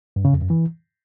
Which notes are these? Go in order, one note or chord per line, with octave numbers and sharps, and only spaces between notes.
G2
C#3
F2
F#2
E3